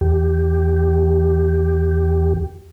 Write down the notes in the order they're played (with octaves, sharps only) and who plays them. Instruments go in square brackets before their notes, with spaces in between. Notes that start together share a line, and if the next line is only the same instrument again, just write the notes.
[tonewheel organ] E2 G4